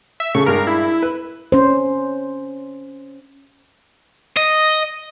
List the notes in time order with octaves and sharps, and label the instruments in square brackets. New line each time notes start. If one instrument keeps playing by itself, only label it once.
[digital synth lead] E5
[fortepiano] C#3 A4 [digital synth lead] C#6
[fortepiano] G2 G#3 [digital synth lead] A#4
[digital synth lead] E4
[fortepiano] B4
[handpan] C#4 C5
[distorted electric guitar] D#5